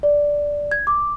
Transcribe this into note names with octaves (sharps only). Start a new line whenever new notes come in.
D5
G#6
D6